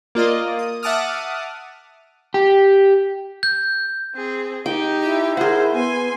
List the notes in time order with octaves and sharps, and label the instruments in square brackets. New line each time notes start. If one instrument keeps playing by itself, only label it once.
[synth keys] A#3 F4 D5 D#5
D#6
E5 F#5 A5 D6 D#6 F6
[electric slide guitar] G4
[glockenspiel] G6
[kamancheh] C4 G#4
[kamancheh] D#4 G4 [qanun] G5
[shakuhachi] E4
[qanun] G#4 F#5 [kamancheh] A#4 C5
[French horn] B3 [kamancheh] G#5 C6